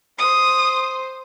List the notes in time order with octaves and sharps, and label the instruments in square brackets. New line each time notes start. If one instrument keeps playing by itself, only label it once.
[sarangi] C5 [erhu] D#6